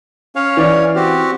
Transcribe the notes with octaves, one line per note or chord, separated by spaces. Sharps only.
C#4 C#5 F5
E3 D5
C4 F#4 G4